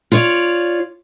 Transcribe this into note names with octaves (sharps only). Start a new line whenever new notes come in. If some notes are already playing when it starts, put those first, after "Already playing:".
F4 C#5 D5